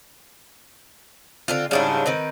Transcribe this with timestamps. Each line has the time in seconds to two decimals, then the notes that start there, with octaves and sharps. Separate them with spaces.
1.48 D3 C4 F4
1.71 G#2 C#3 G3 D4 E4
2.06 D#3 C4 B4